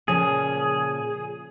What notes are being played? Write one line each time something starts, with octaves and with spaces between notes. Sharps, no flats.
A#2 C#3 F3 G#4